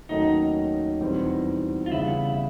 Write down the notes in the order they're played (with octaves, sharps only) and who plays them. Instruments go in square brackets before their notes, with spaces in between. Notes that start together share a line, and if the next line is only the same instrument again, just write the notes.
[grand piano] D#2 D#3 F#3 A3 C#4 [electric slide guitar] D#4
[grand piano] E2 B2 G3 C4
[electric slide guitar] F4
[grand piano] C#3 E3 G3 B3 [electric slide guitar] E4